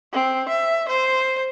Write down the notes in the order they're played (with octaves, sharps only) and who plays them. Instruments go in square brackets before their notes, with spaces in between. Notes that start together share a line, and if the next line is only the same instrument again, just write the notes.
[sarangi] C4
E5
C5